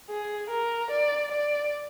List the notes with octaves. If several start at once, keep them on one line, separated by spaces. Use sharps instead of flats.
G#4
A#4
D5
D5